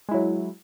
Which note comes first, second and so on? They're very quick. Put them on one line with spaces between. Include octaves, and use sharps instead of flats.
G#3 E4 F#3